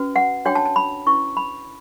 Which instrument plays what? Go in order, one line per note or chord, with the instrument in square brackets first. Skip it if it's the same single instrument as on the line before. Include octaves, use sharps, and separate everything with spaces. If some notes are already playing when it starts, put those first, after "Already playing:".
Already playing: [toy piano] C#4 F#4 B4
F#5
D4 F#4 C#5 G5
A5
A5
B5
C#4 E4 B4 C#6
B5